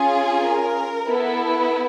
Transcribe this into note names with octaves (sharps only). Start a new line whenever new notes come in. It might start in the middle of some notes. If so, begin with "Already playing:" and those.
Already playing: C#4 F4 G#4
A#4
B3 E4 A4